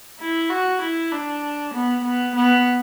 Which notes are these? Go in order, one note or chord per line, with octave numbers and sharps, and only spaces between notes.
E4
F#4
E4
D4
B3
B3
B3